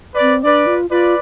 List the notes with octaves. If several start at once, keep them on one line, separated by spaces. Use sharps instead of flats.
B4 D5
C4
D4 B4 D5
F4
F4 B4 D5